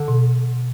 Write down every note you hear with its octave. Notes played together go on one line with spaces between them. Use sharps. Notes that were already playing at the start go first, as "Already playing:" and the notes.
Already playing: D3
B2